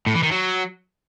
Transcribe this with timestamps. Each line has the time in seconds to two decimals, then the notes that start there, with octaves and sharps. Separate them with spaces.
0.06 A2
0.15 E3
0.23 D#3
0.31 F#3